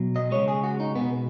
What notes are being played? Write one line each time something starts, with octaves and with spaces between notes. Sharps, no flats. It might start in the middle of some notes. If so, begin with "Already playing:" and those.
Already playing: B2 F#3
D#5
C#3 G#3 C#5
G#4
F#4
D#4
B2 G#3 B3